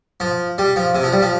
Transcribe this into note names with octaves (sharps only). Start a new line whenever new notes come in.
F3
G3
F3
C3
F3
G3
F3